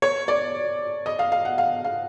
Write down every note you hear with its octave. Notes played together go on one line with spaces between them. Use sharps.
C#5
D5
D#5
F5
F5
F#5
F5
F5